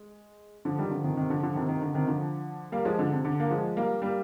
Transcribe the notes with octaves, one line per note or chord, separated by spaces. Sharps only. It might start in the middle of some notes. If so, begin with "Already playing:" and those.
Already playing: G#3
D3 F3
D#3 G3
D3 F3
C3 D#3
C3 D#3
D3 F3
D3 F3
C3 D#3
C3 D#3
D3
C3 D#3
D3 F3
G3 A#3
F3 G#3
D3
C3
D3
A#3
F3 G#3
G3 A#3
G3 A#3